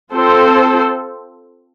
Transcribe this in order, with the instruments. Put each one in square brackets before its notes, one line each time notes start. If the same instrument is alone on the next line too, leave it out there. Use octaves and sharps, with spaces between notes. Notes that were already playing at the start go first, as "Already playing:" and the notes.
[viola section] C4 F4 A4 C5